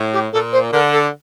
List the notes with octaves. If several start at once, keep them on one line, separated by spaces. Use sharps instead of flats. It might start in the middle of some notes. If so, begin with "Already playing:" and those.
Already playing: A2
G4
A#2 A4
C5
D3 A#4
A4